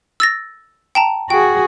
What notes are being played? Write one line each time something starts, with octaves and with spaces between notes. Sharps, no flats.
E6 A6 A#6
G5 A5 A#5
F#4 G#4 G5